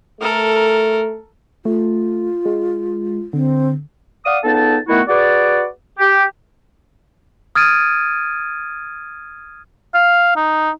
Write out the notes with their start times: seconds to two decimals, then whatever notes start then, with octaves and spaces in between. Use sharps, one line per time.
0.21 A3 A4 A#4
1.65 A3 F4
2.45 G#3
3.33 D3 C4
4.25 D5 F5 F#5 D#6
4.44 C#2 B3 D#4 A4 A5
4.88 D#3 A3 B3 E4 F#4 B4
5.08 F#4 G#4 B4 D5
5.98 G4
7.55 D#6 F6 G#6 A6 D7 D#7
9.94 F5
10.36 D#4